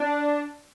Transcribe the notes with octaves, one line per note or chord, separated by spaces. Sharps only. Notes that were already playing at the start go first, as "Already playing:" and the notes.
Already playing: D4